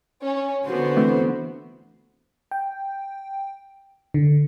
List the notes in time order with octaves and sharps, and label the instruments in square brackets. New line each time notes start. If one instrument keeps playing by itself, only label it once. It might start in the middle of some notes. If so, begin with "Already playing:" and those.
[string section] C#4
[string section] D3 B3 [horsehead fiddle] F#4 C5
[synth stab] E3 A3 C4
[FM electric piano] G5
D3